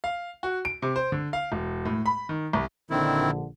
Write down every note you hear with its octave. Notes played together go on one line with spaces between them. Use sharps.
F5
F#4
D7
C3
C5
D3
F5
E1
A2
B5
D#3
C2
A#1 D3 D#3 C4 E4